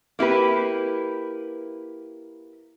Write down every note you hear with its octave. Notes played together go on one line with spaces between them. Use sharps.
A#3 E4 G4 B4